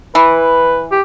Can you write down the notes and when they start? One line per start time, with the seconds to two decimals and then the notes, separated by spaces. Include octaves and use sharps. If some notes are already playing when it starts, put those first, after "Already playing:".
0.15 E3 B4
0.91 G4